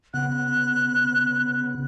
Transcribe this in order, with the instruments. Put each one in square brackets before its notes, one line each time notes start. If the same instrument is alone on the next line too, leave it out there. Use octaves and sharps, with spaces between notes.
[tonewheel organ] C#3 B3 [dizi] F#6